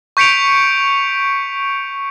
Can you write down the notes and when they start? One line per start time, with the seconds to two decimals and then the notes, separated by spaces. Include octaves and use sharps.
0.17 C#6 G6 B6 C#7 D7 F7